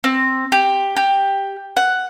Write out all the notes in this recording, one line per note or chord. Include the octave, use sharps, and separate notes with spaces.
C4
G4
G4
F#5